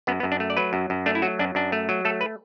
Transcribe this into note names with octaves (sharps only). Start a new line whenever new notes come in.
F#2 B3
B3
F#2
D4
A3
D5
F#3 B4
F#2
F#2
A3 D4
E4
F#3 F#4
F#2 D4
F#2 D4
A3
F#3
A3 A4
B4